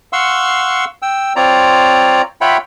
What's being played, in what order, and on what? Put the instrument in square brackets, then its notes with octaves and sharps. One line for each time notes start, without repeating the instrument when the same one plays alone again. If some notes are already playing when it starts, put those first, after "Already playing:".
[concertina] F5 F#5 C6 C#6 E6
G5 E6
C4 F4 C#5 D5 A#5
F4 C#5 E5 F#5 G5 B5